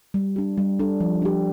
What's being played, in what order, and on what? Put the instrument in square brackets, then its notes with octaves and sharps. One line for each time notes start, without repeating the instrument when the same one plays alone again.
[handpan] G3
D4 G4
G3
D4 A4
F3
D4 G4